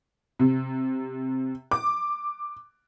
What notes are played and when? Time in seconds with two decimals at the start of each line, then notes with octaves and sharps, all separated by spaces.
0.39 C3
1.71 D6